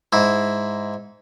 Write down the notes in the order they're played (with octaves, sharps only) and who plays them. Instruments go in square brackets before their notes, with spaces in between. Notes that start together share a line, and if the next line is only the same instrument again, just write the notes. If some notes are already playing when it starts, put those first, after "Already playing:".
[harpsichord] G#2 E4